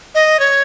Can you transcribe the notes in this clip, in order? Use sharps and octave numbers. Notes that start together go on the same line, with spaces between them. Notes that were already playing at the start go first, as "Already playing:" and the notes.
D#5
C#5